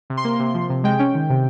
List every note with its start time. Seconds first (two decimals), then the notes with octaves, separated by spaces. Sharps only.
0.10 C3
0.17 C6
0.24 A#3
0.40 C3
0.54 F3
0.70 C3
0.84 G#3 G5
0.99 C#4
1.14 D#3
1.30 C3